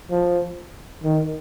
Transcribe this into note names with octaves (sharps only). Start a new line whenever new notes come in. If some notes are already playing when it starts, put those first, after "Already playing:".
F3
D#3